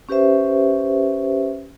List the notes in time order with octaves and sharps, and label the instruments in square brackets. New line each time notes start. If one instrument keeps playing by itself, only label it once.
[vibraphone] C#4 G4 B4 C5 E5